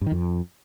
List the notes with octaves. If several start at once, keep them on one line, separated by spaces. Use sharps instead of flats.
G2
D#3
F2